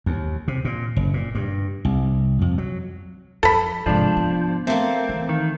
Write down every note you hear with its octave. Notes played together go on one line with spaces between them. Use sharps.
D#2
C3
A#2
F#1
A#2
G2
C2
F2
F#3
F2 A4 B5
G#2 C3 F3 D4
B3
A3 A#3 C4
E3
D#3